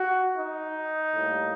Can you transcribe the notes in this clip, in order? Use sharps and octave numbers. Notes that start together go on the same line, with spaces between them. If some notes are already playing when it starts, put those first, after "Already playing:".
Already playing: F#4
D#4
A2 G3 A#3